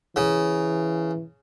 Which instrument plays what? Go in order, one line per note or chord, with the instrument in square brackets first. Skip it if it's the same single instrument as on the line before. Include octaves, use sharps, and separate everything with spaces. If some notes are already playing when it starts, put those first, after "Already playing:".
[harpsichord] C#3 [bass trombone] E3